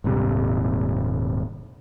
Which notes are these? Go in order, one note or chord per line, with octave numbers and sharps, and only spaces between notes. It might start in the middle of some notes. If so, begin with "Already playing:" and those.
D#1 G#2 C3 G3